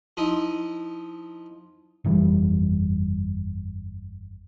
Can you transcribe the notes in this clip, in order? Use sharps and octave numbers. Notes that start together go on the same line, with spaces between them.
F3 D#4 E4
G1 F2 E3 G3